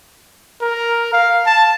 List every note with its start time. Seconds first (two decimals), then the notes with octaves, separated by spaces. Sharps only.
0.62 A#4
1.13 F5
1.46 A5